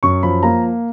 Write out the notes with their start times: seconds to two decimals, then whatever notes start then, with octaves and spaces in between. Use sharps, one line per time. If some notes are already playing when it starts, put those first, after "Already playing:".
0.03 F#2 C#6
0.23 F3 B5
0.43 A#3 A#5